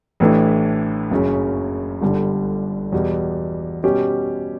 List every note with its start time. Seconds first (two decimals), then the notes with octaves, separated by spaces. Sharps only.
0.20 A1 A2 E3 A3 D4
1.11 F#1 F#2 C#3 F#3 C#4
2.01 G1 G2 D3 G3
2.92 E2 B2 G3 B3
3.83 B2 G3 C#4 G4